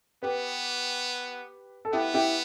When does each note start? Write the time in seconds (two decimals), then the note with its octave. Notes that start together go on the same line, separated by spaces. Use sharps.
0.23 B3 G4 B4
1.85 A4
1.93 B3 E4 G4
2.14 E4 G4